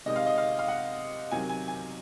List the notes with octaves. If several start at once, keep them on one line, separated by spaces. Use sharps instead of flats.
C3 D#3 G#3 D#5
F5
D#5
F5
F5
F#5
C3 D#3 F#3 G#5
G#5
G#5